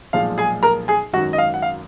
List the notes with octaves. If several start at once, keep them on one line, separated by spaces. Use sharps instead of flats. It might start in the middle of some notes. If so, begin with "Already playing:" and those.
B1 A#2 F3 G#3 F5
G#4 G#5
A#4 A#5
G#4 G#5
G#1 F#2 D#3 F#3 F#4 F#5
D#5
F5
F#5
F5